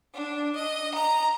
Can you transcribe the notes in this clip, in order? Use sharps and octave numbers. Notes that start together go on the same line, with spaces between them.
D4
D#5
A#5